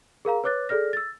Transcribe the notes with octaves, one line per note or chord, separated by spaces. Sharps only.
G#4 A#4 F5 A#5
B4 C#5 D6 F#6 A6
G#4 A4 D5 F6 A#6
E6 A6